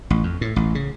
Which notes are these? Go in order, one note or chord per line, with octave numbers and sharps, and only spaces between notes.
A1
F2
A2
A1
C#3